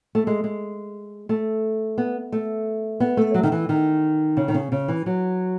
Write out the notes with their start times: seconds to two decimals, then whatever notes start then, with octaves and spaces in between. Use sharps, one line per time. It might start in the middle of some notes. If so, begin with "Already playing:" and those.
0.15 A3
0.27 G#3
0.44 G#3
1.29 A3
1.98 B3
2.32 A3
3.00 B3
3.17 A3
3.34 F#3
3.43 D#3
3.52 E3
3.69 D#3
4.37 C#3
4.48 D#3
4.54 C#3
4.72 C#3
4.88 E3
5.06 F#3